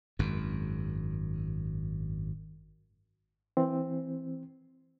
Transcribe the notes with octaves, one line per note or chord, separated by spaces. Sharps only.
G#1 F#2
E3 C4